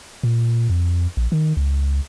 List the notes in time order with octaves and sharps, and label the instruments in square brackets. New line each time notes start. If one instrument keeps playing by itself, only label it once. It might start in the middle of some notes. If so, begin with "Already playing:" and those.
[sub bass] A#2
F2
A#1
D#3
C#2